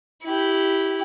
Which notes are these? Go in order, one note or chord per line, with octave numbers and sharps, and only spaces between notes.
E4 G4